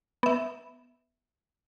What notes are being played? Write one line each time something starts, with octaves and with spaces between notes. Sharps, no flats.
B3 E5